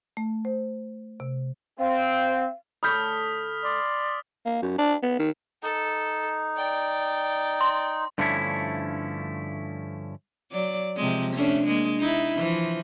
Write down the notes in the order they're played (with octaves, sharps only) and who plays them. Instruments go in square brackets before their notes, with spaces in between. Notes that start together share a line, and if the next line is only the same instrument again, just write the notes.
[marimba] A3
C5
C3
[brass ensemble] C4 [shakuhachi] F5
[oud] D2 A3 C#5 [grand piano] B5 G6 [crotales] D#6 F6 B6
[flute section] D5 C6
[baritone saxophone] A#3
F#2
D4
B3
D#3
[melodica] D#4 [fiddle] A4
[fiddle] D5 G5
[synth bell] C6
[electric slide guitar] G2 D3 F3 A3 C#4 E4
[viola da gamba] F#3 D5
C3 F3 G#3
A3 C#4 D4
G#3 A#3
D#4 E4
E3 F3